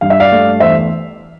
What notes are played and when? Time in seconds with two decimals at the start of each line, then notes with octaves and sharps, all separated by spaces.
0.01 G2 F5
0.10 E5
0.20 D5 F5
0.32 A3
0.60 E2 C5 E5